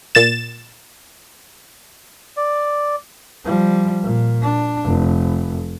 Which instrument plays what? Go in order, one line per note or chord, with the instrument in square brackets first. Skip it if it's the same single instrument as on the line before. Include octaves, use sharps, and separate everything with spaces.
[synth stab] A#2 A6 E7
[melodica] D5
[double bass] F3 G3
A#2
D4
F1